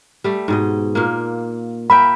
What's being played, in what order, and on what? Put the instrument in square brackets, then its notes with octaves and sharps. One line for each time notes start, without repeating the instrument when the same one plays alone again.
[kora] G3 A3
G#2 B2 D#5
A#2 A#3
[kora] A#3 E5 G5 [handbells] B5